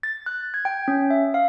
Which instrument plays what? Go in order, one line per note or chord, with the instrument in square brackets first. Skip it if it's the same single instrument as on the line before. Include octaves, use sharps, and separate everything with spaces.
[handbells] A6
F#6
G#6
G5
C#4
E5
F5